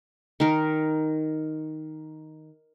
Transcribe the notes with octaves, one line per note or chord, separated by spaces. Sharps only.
D#3 A#4